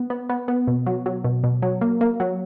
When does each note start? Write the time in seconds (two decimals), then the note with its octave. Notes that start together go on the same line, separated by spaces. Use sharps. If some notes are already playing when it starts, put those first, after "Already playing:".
Already playing: B3
0.10 B3
0.29 B3
0.48 B3
0.67 B2
0.86 F#3
1.06 F#3
1.24 B2
1.44 B2
1.62 F#3
1.81 A#3
2.01 A#3
2.20 F#3